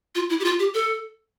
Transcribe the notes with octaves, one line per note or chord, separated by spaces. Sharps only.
F4
E4
G4
F4
G4
A4